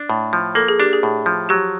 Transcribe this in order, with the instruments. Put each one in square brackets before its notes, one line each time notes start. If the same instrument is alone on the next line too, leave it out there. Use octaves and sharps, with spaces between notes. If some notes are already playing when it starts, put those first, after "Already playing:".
Already playing: [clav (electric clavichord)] D4
A2
F3
[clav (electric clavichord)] A#3 [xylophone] A4
[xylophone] G#4
[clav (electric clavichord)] D4 [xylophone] G4
[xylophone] G#4
[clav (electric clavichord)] A2
F3
[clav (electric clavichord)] F#3 [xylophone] G4